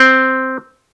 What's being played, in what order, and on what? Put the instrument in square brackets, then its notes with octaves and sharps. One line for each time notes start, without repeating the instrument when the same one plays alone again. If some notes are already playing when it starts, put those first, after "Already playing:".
Already playing: [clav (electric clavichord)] C4